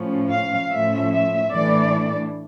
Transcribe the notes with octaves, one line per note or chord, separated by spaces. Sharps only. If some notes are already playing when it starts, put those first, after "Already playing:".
Already playing: A2 F3 C#4
F5
A2 F3 A3 C#4 E5
E5
A2 E3 A3 D4 D5